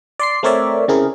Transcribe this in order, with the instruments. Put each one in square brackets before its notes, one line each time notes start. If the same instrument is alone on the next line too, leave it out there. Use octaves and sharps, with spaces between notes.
[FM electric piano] D5 C6 C7
A3 C4 A#4 C#5 D5 E5
C#3 C4 E4 G#4 A#4